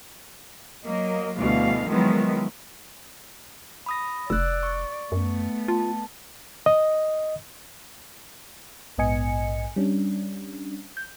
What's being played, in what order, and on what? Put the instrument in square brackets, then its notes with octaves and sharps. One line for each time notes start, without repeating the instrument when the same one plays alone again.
[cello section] F#3 A#3 D#5
D2 B2 E3 G3 F5
D#3 F3 F#3 G#3 B3 E4
[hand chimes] B5 D#6 A#6
[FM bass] F1 [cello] D5 [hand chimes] E6 F#6
[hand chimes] C#6
[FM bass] F#2 [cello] A3 B3
[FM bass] F4 [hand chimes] A5
[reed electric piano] D#5
[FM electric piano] A#1 G#2 B3 D#5 G#5 C#7
G3 C#4 D4
G6